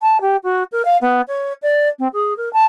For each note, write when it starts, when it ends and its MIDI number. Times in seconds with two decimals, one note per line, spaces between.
0.02 0.21 81
0.21 0.36 67
0.43 0.63 66
0.72 0.82 70
0.85 0.97 77
1.01 1.21 59
1.28 1.53 73
1.62 1.88 74
1.99 2.08 60
2.13 2.33 68
2.37 2.51 70
2.53 2.65 81